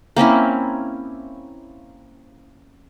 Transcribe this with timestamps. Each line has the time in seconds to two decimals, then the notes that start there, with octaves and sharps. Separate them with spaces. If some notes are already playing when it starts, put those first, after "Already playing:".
0.16 A#3 C4 C#4 E4